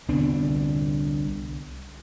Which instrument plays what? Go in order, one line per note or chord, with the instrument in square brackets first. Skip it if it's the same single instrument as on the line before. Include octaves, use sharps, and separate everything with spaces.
[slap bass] C2 D3 B3 D4